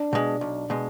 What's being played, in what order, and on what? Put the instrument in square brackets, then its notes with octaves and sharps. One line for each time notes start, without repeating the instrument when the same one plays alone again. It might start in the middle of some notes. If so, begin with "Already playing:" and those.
Already playing: [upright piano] D4
[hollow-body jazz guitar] B2 G#3
B1
B2 G#3